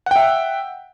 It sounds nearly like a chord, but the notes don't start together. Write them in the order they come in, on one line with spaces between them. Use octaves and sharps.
F#5 G5 E5